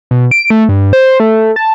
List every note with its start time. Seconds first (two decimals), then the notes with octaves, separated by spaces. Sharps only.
0.11 B2
0.31 D7
0.50 A3
0.69 G2
0.93 C5
1.20 A3
1.56 A5